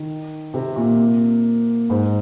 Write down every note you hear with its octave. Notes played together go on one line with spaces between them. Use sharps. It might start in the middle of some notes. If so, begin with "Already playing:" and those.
Already playing: D#3
C3
A#2
G#2